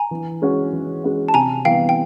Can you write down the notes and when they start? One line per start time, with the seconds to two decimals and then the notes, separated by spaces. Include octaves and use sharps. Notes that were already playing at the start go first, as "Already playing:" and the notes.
Already playing: G#5 A#5
0.11 E3
0.42 G#3 C#4 F#4
0.73 E3
1.04 G#3 C#4 F#4
1.28 A5
1.34 C3 G#5 A#5
1.65 E3 G3 B3 F5 G5
1.89 G5